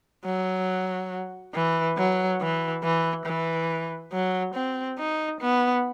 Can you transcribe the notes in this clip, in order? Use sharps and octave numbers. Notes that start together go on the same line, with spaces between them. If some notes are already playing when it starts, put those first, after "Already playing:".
F#3
E3
F#3
E3
E3
E3
F#3
C4
D#4
B3